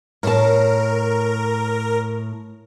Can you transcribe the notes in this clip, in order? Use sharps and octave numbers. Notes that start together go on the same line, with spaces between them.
A2 A#4 C#5 A5